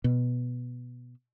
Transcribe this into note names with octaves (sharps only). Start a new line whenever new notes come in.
B2